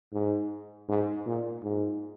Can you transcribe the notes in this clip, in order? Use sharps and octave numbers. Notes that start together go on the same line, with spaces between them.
G#2
G#2
A#2
G#2